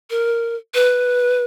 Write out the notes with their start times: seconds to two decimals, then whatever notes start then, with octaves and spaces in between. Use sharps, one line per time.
0.10 A#4
0.74 B4